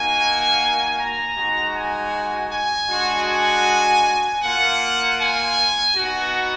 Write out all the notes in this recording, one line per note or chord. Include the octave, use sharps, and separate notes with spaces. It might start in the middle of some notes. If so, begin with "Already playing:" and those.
Already playing: A#3 D#4 F#4 G#5
A#5
G#3 D#4 F#4
G#5
G#5
G#3 D4 F#4
G#5
A#3 F4 F#5
G#5
B3 D#4 F#4